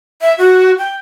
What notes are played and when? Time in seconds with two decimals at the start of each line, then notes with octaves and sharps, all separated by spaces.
0.21 E5
0.38 F#4
0.78 G5